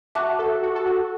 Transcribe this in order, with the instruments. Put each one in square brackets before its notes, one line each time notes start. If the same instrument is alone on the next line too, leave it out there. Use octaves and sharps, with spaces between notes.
[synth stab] F#4 [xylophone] E5 A5 D6 F#6
[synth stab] A4
F#4
A4
F#4